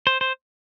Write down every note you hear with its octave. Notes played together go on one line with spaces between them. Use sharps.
C5
C5